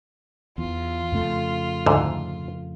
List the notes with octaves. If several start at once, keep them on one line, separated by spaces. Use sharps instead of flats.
E2 F4
F2 C#3 A3
D2 G#2 D3